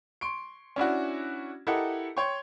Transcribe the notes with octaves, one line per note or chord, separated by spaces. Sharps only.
C6 C#6 D7
C#4 D4 E4 F#4
E4 G4 A4 A#4 D#5 F#5
C#5 G5 C6 C#6